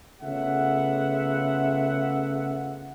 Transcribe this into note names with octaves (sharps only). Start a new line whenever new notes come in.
C#3 A3 B3 F4 E5 F#5